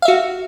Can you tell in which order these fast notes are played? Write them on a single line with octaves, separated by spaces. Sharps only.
F5 E5 F#4